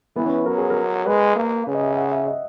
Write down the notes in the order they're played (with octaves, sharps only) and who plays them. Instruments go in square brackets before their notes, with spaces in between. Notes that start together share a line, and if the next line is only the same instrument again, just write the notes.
[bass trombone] E3 [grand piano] B3
[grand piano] C#4
[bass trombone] F#3 [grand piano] A#4
[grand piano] G#4
A#4
[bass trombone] G#3 [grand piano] B4
[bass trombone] A#3
[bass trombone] C#3 [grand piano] B4
[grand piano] D#5
E5
E5
F#5
E5
D#5